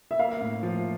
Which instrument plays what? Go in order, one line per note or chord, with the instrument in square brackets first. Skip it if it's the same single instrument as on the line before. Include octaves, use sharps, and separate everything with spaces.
[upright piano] E5
[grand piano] A#3 [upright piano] F5
[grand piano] A2
F3